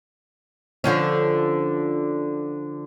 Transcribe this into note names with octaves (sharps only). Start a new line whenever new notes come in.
D3 F3 C#4